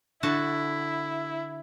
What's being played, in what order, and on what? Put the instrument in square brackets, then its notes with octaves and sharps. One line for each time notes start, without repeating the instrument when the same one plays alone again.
[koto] D3 F#4 A5 [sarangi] E4